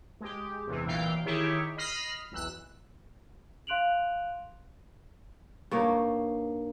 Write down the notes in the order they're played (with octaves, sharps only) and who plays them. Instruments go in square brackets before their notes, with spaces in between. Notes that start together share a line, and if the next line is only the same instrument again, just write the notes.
[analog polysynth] G#3 G4
E2 C3 E3
B1 A#2 E3 F5 G5
D#3 E4 G4 G#4 C#5
D#5 B5 F6 C7
B1 E2 E6 F#6
[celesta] F5 C6 F#6 D7 F7 F#7
[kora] G2 A#3 D#4 C#5